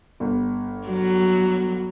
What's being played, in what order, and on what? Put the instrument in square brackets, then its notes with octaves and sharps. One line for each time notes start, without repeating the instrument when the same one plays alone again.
[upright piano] G1
[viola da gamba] F#3